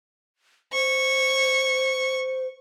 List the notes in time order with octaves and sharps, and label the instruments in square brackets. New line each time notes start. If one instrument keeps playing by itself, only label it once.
[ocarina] C5 [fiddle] C#6